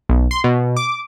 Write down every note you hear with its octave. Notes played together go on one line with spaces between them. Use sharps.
B1
C6
B2
D6